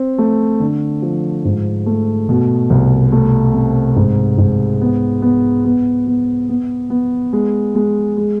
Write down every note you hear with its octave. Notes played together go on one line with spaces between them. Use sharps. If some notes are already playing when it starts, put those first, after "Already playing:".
Already playing: C4
A3
D3
F3
G#2
A3
B2
C2
A3
C3
G#2
G#2
B3
B3
B3
B3
B3
B3
G#3
G#3
G#3